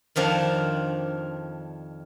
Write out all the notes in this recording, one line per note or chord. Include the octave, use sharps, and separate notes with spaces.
F2 D#3 F3 D4